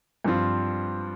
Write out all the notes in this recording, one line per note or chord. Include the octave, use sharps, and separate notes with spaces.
G2 F3 C4 F4